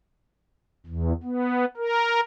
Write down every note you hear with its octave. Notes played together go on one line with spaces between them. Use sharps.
E2
B3
A#4